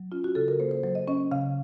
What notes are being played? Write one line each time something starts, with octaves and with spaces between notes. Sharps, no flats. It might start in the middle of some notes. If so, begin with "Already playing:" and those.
Already playing: F#3
C#4 F4
F#4
C#3 A4
A#4
A#3 C5
C5
F#3 C5
D#5
C#4 D#5
C#3 F5